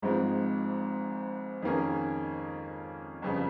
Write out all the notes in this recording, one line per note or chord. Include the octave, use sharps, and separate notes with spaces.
G#1 G#2 F3 G#3 C4
F2 D#3 A#3 C#4 G#4
G1 F2 C#3